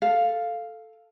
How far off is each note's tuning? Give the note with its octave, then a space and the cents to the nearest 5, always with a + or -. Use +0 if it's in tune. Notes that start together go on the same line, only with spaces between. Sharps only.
A4 +0 F5 +0